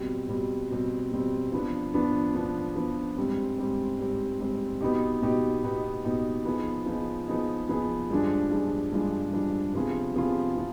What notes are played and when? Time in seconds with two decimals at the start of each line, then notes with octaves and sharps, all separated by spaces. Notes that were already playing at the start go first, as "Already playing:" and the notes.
Already playing: B2 G3 C4
0.29 B2 G3 C4
0.71 B2 G3 C4
1.12 B2 G3 C4
1.52 F3 B3 D4
1.94 F3 B3 D4
2.35 F3 B3 D4
2.76 F3 B3 D4
3.17 G#2 G3 C4
3.58 G#2 G3 C4
3.99 G#2 G3 C4
4.40 G#2 G3 C4
4.81 B2 B3 D#4 G4
5.22 B2 B3 D#4 G4
5.64 B2 B3 D#4 G4
6.04 B2 B3 D#4 G4
6.45 F3 B3 D#4 G#4
6.86 F3 B3 D#4 G#4
7.27 F3 B3 D#4 G#4
7.69 F3 B3 D#4 G#4
8.10 G2 F3 G#3 D4
8.51 G2 F3 G#3 D4
8.93 G2 F3 G#3 D4
9.33 G2 F3 G#3 D4
9.74 C3 F3 B3 F4 G#4
10.15 C3 F3 B3 F4 G#4
10.56 C3 F3